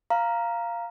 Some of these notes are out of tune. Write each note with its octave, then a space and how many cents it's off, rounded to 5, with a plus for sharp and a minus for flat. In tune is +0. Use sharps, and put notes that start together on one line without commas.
F5 -5 A#5 +0